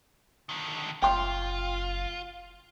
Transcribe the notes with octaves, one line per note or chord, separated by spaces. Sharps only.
D3 D#3
F#1 F4 G5 C6